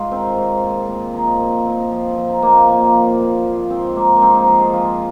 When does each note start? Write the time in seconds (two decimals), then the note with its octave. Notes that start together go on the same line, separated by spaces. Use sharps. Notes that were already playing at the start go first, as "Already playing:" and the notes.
Already playing: G#2 F4
0.11 D#3 C4
0.37 G#2
0.63 A#2
0.89 A#2
1.14 F3 D#4
1.40 A#2
1.65 A#2 C4
1.91 F3
2.16 F3 C4
2.29 D#4
2.42 A#2 A#3
2.55 C4
2.68 A#2 A#3
2.94 F3
3.20 A#2
3.45 F3
3.70 G#2 C4
3.96 G#2 A#3
4.16 A#3
4.22 G#2 C4
4.35 D#4
4.47 F3 C5
4.60 G#4
4.73 F3 F4